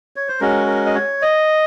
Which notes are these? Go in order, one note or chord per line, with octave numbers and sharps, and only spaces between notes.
C#5
C5
G#3 C#4 F#4 A#4
A#4
D#5
C#5
D#5